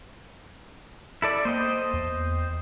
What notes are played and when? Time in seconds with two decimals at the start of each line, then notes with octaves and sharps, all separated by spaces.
1.22 E4 A4 D5
1.45 A#3 C5 D#5 G5
1.93 E2